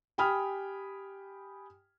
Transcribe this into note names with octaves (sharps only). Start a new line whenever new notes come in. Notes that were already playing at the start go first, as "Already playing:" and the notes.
G4 G5 G#5 B5 D#6 F6